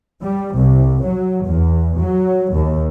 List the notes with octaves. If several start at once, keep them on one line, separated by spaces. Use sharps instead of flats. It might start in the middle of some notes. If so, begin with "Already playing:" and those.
G3
C2
F#3
E2
F#3
D#2